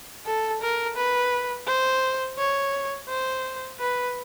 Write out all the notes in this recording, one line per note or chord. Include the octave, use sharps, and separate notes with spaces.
A4
A#4
B4
C5
C#5
C5
B4